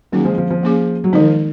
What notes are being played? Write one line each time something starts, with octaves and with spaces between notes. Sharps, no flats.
D#3 F#3 A#3 C#4 G#4
F3 G#3
F3
F3
A#3 C#4 G#4
F#3
D#3 F3 G#3 D#4